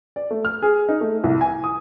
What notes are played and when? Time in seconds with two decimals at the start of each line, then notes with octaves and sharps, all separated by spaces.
0.16 D5
0.31 A3
0.45 F6
0.62 G#4
0.89 D#4
1.01 A3
1.24 C2
1.41 G#5
1.64 D#6